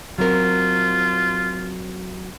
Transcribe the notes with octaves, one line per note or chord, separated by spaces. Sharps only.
F#3 C4 F4 A#4